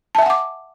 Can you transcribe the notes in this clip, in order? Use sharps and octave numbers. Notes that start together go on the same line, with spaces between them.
E5 F#5 G#5 A5 D6